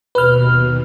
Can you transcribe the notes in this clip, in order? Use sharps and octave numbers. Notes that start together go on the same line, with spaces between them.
D#2 B2 B4 F6